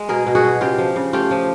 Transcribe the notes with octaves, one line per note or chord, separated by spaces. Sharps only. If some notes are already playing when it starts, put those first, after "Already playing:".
Already playing: G#3
B2 G#4 A#4
B2
F#4 G#4
B2
C#3 F4 G4
F3
C#3
A3 F4 G4
F3